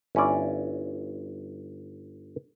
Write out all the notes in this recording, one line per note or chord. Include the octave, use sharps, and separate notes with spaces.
G1 C#4 E4 D5